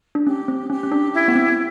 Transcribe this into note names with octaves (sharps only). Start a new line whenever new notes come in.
D4
C#4 G4
C4
C#4 G4
C#4
D4
E4
B3
C4